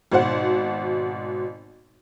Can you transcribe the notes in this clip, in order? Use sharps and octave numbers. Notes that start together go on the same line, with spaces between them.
G#1 B2 C5 F#5